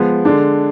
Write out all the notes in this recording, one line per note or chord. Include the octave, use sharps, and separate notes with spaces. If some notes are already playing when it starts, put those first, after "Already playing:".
Already playing: F3 G#3 B3
D3 G#3 D4